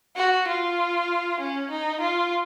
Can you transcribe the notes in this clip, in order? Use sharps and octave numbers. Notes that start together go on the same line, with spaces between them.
F#4
F4
C#4
D#4
F4